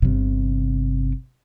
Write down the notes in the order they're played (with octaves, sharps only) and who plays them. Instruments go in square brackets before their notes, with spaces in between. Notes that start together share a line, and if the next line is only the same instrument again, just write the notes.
[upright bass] G1 C3